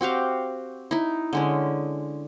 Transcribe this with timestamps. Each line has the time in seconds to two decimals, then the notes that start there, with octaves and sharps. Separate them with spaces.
0.01 C4 F#4 G4 F5
0.91 D#4 E4
1.33 D3 G#3 C#4